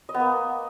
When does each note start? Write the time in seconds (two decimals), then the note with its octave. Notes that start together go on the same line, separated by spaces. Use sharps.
0.09 D#5
0.14 B3
0.20 A#3